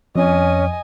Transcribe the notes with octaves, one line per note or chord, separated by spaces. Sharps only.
F2 C#4 D#5 G#5